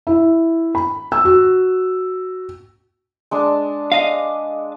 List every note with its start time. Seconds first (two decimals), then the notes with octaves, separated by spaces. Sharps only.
0.07 E4
0.75 B5
1.12 E6
1.25 F#4
3.31 G#3 D4 A5
3.92 D#5 F5